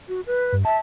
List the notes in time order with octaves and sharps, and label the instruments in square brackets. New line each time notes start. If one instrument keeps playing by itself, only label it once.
[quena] F#4
B4
[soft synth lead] G2
[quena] E5 [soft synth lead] A5